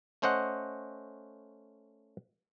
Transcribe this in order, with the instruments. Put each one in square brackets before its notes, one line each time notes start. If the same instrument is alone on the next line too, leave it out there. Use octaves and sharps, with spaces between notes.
[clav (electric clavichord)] A3 C#4 C5 D#5 F#5